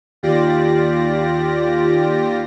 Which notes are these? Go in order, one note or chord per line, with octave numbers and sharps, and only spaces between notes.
D#2 F4 G4 D5 A#6